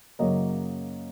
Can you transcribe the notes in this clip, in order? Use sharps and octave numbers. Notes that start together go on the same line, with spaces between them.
F#2 C#3 F#3 A#3 D#5